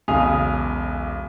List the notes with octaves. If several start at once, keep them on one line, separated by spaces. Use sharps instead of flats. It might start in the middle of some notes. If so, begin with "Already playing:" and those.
E1 B1 C#3 G#5 D#6 F7